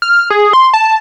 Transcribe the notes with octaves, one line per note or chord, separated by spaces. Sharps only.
F6
G#4
C6
A5